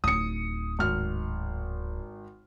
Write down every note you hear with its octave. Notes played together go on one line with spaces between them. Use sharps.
D1 D#4 D#6 C#7
G#1 F6